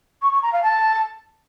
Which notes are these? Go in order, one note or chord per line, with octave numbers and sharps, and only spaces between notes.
C#6
C#6
A#5
F5
A5